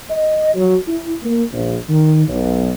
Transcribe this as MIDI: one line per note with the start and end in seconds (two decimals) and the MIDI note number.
0.10 0.50 75
0.54 0.76 54
0.88 1.12 64
1.23 1.43 58
1.52 1.75 34
1.89 2.23 51
2.27 2.71 35